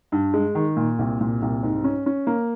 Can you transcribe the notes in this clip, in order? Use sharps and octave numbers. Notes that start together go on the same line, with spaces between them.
G2
G#3
D#3
A#2
C2
A#2
C2
G#2
C#4
C#4
A#3